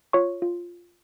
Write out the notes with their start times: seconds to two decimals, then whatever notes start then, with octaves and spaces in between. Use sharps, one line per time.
0.13 F4 C#5 C#6
0.42 F4